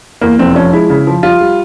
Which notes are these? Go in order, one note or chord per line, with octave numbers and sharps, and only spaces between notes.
E2 A#3
F1 C4
F3 C#4
G#3 E4
C#3
F3
G3 F4
G3